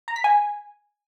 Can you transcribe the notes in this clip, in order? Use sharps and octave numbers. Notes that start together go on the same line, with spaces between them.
A#5
B6
G#5